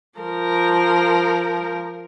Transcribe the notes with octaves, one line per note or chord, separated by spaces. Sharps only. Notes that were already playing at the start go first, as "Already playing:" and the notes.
F3 A#4